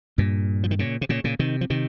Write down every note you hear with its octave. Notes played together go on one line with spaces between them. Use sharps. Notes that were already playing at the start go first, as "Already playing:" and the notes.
G2 A#2
F3
D#3
A#2 C#3
C3
A#2 C#3
A#2 C#3
C3 D#3
F3
C3 D#3